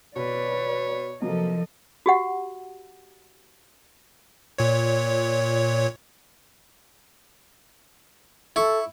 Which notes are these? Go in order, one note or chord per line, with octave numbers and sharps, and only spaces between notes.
B2 B4 C#5 D5
C3 F3 F#3 A#3 A4 D#5
F#4 G4 F#5
A#2 C#5
E4 A4 C#6